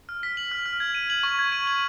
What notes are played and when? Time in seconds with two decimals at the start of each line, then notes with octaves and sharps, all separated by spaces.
0.09 F6
0.23 B6
0.37 F#7
0.52 F6
0.66 F6
0.80 G#6
0.95 D#7
1.10 F#7
1.23 C#6
1.39 G#6
1.52 D#7
1.67 F#7